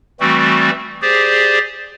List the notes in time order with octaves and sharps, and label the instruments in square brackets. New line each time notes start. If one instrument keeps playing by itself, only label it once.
[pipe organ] E3 G3 A3 C4 F#4
G4 G#4 C5 D5